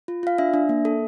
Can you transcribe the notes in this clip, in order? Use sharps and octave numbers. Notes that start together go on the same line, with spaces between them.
F4
F4 F5
D4 E5
D4
A#3
A4